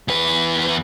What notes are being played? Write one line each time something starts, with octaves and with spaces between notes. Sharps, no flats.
E2 B4